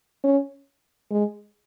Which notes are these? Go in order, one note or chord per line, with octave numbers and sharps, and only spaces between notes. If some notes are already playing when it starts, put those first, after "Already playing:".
C#4
G#3